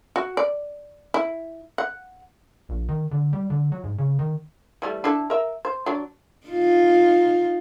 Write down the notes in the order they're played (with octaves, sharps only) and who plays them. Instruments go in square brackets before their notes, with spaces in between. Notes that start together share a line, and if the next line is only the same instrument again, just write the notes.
[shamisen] F#4
D5
E4
F#5
[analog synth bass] A#1
D#3
D3
G3
D3
F#3
G#2
C#3
D#3
[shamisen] E3 G3 A3
D4 E4 A4
A#4 E5
C5
F#3 D4
[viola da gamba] D#4 F4